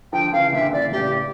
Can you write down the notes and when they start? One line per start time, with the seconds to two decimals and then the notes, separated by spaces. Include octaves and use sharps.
0.13 D3 F3 G5
0.33 C#3 E3 F5
0.53 A#2 D3 E5
0.73 C#3 E3 D5
0.92 A2 C#3 G4